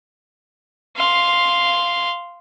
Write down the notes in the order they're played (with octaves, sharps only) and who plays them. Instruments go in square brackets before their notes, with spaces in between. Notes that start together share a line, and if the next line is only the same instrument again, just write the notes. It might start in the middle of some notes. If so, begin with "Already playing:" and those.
[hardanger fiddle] F5 C6